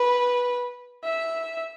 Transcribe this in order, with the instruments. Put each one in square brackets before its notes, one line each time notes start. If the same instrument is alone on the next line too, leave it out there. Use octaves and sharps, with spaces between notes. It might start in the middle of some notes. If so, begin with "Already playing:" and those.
Already playing: [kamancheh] B4
E5